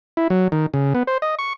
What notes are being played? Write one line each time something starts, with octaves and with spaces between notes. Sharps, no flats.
E4
F#3
D#3
C#3
B3
C5
D#5
C#6